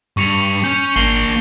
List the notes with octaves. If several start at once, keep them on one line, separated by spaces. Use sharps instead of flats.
G2 C#6 C#7 F7
C#4 G6
G#1 A#3 D4 C7 F#7 G7